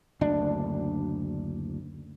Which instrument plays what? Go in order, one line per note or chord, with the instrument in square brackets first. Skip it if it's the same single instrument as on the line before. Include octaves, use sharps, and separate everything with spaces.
[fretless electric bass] F#1 D2 D4